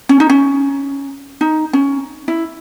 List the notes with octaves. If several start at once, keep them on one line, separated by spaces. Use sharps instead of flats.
C#4
D#4
C#4
D#4
C#4
E4